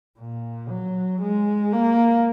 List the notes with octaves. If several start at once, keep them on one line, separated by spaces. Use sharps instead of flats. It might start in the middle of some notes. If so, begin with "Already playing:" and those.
A#2
F#3
G#3
A#3